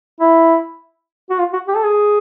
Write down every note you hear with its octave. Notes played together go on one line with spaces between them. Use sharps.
E4
F#4
F4
F#4
G4
A4
G#4